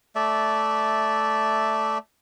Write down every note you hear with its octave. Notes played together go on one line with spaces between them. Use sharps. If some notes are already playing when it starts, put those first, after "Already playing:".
A3 D5 E5